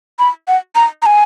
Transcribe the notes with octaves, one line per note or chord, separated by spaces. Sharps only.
B5
F#5
A#5
A#5
G#5